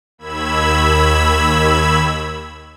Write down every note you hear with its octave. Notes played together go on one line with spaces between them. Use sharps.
D#2 B5 E6 G#6